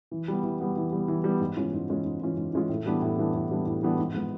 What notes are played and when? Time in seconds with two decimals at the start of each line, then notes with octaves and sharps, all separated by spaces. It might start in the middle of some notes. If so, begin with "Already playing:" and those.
0.11 E3
0.28 G3 B3
0.43 E3
0.60 G3 B3
0.76 E3
0.92 G3 B3
1.08 E3
1.24 G3 B3
1.41 G#2
1.56 E3 G#3 C#4 F4
1.73 G#2
1.89 E3 G#3 C#4 F4
2.05 G#2
2.21 E3 G#3 C#4 F4
2.37 G#2
2.53 E3 G#3 C#4 F4
2.69 A2
2.86 E3 G3 B3 D4
3.02 A2
3.18 E3 G3 B3 D4
3.33 A2
3.50 E3 G3 B3 D4
3.66 A2
3.83 E3 G3 B3 D4
3.99 G#2
4.14 F3 G#3 B3